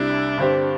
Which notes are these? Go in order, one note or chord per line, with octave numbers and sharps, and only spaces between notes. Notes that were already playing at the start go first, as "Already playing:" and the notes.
Already playing: C2 C3 G3 D4 E4
G2 D3 C4 G4 C5